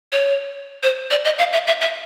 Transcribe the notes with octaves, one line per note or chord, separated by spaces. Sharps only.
C#5
C5
D5
D#5
F5
E5
E5
E5